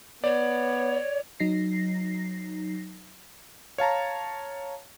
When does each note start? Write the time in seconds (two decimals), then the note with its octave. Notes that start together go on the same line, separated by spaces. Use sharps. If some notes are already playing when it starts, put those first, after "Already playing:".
0.24 B3 C#5 D5
1.40 F#3 D#4 A#6 C7
3.78 C#5 F5 A5 A#5